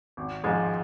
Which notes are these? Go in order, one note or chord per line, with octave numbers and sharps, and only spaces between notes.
G#1
G#2 F3 G#3